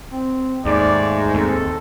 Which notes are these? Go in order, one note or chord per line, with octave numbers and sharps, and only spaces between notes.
C4
D#2 G#2 A3 D5
D#2 C4 A4